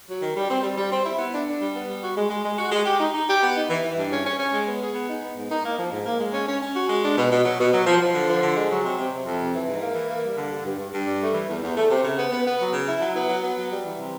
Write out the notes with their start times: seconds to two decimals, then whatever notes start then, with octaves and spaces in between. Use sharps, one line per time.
0.09 F#3
0.22 D#3
0.36 G3
0.50 C4
0.63 G3
0.77 G3
0.91 C4
1.05 E4
1.19 B3
1.33 D4
1.47 D4
1.61 G3
1.75 B3
1.89 G3
2.02 F#4
2.16 G#3
2.30 G#3
2.45 G#3
2.58 F#4
2.72 G#3
2.85 G4
2.99 D#4
3.15 D#4
3.28 G4
3.42 B3
3.55 D#4
3.69 E3
3.84 E3
3.97 G2
4.11 C#4
4.25 C#4
4.39 C#4
4.53 G#3
4.66 B3
4.81 G#4
4.94 B3
5.08 D#4
5.23 B3
5.36 G#2
5.50 D#4
5.64 A#3
5.79 F3
5.92 G#2
6.06 A#3
6.19 G#3
6.33 C#4
6.48 C#4
6.62 C#4
6.75 F#4
6.89 G#3
7.03 D4
7.18 B2
7.31 B2
7.45 F#3
7.59 B2
7.73 F#3
7.86 F3
8.01 F3
8.15 D3
8.28 F3
8.43 D3
8.56 G#3
8.71 F#3
8.84 C3
8.98 C3
9.12 C3
9.26 F2
9.40 C3
9.54 E3
9.68 G#2
9.82 A#3
9.95 E3
10.09 A#3
10.24 G3
10.36 D3
10.50 G2
10.65 G2
10.79 G2
10.93 G2
11.06 G3
11.20 A3
11.34 E3
11.49 E2
11.62 E2
11.76 A3
11.90 C3
12.04 C#3
12.18 B3
12.32 B3
12.46 B3
12.60 F#3
12.73 C#3
12.87 E4
13.01 F#3
13.15 B3
13.29 F#3
13.43 B3
13.57 F#3
13.71 G3
13.85 E3
13.99 C3